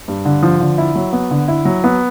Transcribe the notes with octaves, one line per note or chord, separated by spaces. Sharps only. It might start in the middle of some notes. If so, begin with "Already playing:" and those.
G2
D3
F3
D3
E4
F#3
B3
D3
E4
F#3
B3